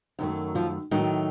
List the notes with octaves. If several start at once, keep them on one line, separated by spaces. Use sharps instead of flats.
F#2 D#3 F#3 A3
F3 F4
A2 D#3 F#3 A3 D#4